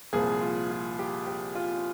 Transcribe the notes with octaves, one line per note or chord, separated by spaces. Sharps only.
C2 A#2 F3 A#3 G#4
F4
F4
G4
G4
F4